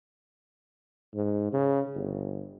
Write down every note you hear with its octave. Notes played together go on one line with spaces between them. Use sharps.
G#2
C#3
G1